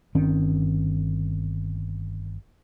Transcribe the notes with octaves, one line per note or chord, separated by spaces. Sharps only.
G1 D#3 C4 C#4